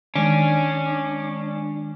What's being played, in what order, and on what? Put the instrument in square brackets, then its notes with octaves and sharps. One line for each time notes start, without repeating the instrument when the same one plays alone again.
[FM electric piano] D#3 G#3 [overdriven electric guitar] C#4 [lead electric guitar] D4